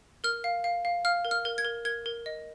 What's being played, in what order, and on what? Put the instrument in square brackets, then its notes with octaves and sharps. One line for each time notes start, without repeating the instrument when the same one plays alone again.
[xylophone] A#4 F6
F5
F5
F5
F5 F6
A#4
F6
A#4
G#6
A#4
A#4 G#6
A#4
D#5